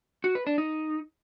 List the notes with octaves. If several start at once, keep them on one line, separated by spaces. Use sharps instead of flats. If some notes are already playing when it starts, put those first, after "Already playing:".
F#4
B4
D4
D#4